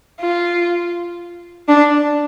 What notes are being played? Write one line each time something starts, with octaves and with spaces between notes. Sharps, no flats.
F4
D4